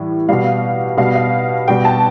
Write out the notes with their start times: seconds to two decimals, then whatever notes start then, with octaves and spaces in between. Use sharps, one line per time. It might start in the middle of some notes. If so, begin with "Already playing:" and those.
Already playing: A2 E3 G3
0.29 B2 G3 F5
0.98 B2 G3 F5
1.15 F5
1.68 B2 G3 G5
1.85 A5